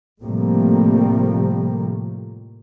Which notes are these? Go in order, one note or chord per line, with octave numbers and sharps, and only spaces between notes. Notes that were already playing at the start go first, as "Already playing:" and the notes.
A2 C3 F3 G3 A3 A#3